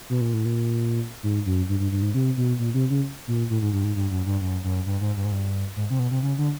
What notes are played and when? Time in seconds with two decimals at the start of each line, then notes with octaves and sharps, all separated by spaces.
0.10 B2
0.21 A#2
0.34 A2
0.45 A#2
1.23 G#2
1.46 F#2
1.69 G2
1.80 G2
1.92 G2
2.02 G#2
2.14 C3
2.37 B2
2.59 A#2
2.74 C3
2.90 C#3
3.28 A#2
3.50 A2
3.62 G#2
3.73 G2
3.84 G#2
3.96 G2
4.11 F#2
4.26 G2
4.41 F#2
4.64 F#2
4.86 G2
5.01 G#2
5.16 G2
5.25 G#2
5.32 G2
5.76 G#2
5.90 C3
5.99 B2
6.11 C3
6.22 C#3
6.38 D3